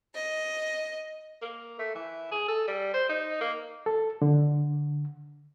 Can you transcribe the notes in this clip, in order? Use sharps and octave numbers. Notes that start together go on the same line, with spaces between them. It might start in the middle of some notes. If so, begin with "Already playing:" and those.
D#5
A#3
A3
E3
G#4
A4
G3
C5
D#4
A#3
A4
D3